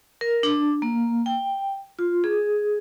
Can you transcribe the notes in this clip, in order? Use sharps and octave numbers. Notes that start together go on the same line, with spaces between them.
A#4
D4
A#3
G5
F4
G#4